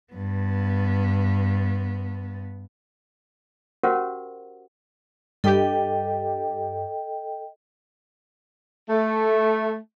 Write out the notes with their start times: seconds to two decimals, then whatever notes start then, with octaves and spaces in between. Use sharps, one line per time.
0.13 G2 B3
3.83 C#4 F#4 G4 A#4 C5 F#5
5.44 G2 G4 A4 D#5 G5
8.89 A3